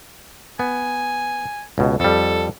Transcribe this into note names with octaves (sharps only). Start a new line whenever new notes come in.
B3 G#5
C#2 B2
F2 G3 A4